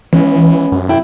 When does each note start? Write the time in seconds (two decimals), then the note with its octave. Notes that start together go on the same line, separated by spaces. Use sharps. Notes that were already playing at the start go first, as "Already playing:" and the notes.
0.13 E3 G#3 B3 C#4
0.72 F#2
0.89 C3 E4 G5